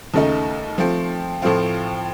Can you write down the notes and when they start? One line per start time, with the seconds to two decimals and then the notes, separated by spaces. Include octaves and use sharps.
0.14 D#2 C#3 A3 D#4
0.78 F3 A3 C4
1.42 A2 F3 A3 C4 F4